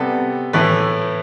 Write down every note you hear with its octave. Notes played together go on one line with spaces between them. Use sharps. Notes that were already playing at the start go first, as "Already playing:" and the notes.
Already playing: C3 G3 B3 A4
A2 E3 A3 B4